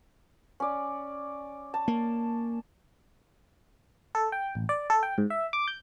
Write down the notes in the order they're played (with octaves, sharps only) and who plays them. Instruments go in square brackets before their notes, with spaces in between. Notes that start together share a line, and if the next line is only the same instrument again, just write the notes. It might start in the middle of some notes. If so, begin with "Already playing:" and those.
[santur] C#4 D5
A5
[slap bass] A#3
[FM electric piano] A4
G5
A1
D5
A4
G5
G#2
E5
D6
G6